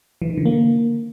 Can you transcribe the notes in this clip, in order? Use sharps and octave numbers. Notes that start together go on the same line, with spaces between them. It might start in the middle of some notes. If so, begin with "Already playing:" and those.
E3
D#3
D3
A#3